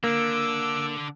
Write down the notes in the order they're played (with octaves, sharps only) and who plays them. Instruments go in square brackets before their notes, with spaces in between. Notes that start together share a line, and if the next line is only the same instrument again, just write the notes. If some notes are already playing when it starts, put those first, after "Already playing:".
[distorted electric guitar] D3 D4 [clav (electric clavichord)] A#3 [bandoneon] D6 E6